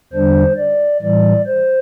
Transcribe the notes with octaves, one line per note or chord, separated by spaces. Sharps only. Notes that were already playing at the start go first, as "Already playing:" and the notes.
E2 D3 G3 D4 C5
D5
A2 E3 G3 D5
C5